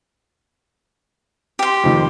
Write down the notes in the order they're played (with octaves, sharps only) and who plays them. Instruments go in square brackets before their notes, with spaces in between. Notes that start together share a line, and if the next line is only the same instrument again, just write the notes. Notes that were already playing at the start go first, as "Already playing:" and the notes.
[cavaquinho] G4 C6
[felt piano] F2 D#3